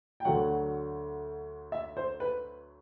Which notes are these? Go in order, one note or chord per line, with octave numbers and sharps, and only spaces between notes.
G5
D2 D3 F#3 F#5
E5
C5
B4